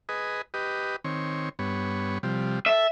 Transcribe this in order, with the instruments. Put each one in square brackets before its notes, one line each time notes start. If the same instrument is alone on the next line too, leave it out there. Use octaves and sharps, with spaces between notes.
[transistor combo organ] G#4 B4 D#5
G4 B4 D#5
D#3 C4 C#5
G2 B3 C#5
C3 F3 G3
[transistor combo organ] A4 [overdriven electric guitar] E5